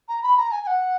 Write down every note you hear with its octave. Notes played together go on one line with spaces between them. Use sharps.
A#5
B5
A#5
G#5
G#5
F#5